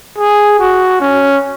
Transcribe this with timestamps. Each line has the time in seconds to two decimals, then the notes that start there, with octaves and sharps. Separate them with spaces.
0.18 G#4
0.60 F#4
1.01 C#4